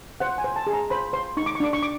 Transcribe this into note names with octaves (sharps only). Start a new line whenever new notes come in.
C5 F#5
G#5
C5
A5
G#4
A#5
C5 B5
C5 C6
D#4 C#6
D6
C#6
D4 D6
C#6
D6